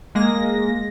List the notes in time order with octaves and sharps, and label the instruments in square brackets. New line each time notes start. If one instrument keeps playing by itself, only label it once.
[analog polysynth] G#3 A#3 A#6